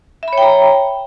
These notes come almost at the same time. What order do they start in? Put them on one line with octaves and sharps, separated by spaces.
E5 B5 C#5 G5 A#5